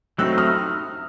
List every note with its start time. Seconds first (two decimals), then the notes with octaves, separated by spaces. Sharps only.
0.18 F#3 A3 C4 D#4 E6 F#6
0.38 D#6 F6